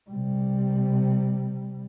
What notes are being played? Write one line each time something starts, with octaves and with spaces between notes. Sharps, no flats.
C3 G3